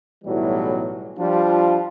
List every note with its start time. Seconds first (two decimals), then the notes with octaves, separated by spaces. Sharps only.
0.25 B1 A2 E3 F#3 G3
1.19 F3 G3 D4 F4